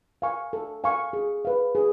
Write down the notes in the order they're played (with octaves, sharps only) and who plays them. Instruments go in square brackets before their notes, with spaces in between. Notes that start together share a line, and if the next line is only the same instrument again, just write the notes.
[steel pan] F5 G#5 C#6
A4
F5 G#5 C#6
G#4
B4 F5
G#4